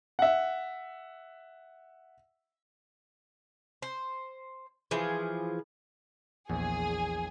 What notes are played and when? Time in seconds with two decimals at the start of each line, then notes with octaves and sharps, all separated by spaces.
0.19 E5 F#5
3.82 C5
4.91 E3 F3 G#4
6.49 A#1 E2 G#4